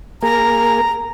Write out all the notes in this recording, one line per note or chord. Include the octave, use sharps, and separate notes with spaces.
A#3 G#4 A#5